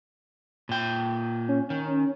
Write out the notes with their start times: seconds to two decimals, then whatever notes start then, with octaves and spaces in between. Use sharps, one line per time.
0.69 A#2 G5
1.49 C#4
1.70 D#3